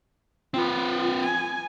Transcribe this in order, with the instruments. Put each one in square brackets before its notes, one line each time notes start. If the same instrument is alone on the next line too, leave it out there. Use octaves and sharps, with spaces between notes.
[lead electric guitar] C4 B4 [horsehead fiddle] F4
[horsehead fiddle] G#5